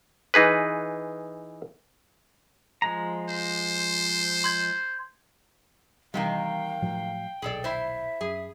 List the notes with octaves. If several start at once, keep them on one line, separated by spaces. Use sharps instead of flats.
E3 D#4 G#4 B4
F3 G#3 A#5
C5
C6 G6 G#6
C3 D#3 E3 G3 A#3 F5 G5
A2 F3 F#3
D#1 B1 G#4 A4 D5
E4 C5 E5
F#2 G#4